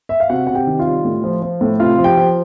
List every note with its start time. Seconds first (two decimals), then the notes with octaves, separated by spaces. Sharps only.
0.09 E5
0.20 F5
0.30 C3 F#4 F#5
0.47 C3 F#5
0.55 G4 G5
0.67 D#3
0.79 F4 F5
0.87 G3
1.04 A2
1.24 F3
1.42 F3
1.61 A2
1.79 C3 F4 F5
1.98 F3
2.04 G4 G5
2.17 F3